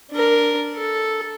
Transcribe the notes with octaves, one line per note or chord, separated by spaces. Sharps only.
D4 A#4
A4